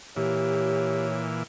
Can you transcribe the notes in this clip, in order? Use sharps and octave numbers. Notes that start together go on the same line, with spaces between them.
A#2 E3 G4 C#5